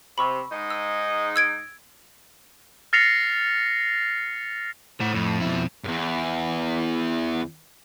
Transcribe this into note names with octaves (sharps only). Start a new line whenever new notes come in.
C3 B5 C#6 E6
G#2 G#3 D#4
E6
E6 G#6 D7
F6 A6 A#6 C7 C#7 F7
A2 C5 F#5
F2
B2 E4
E2 G2